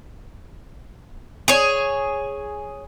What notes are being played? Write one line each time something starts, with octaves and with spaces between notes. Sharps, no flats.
G#4 C#5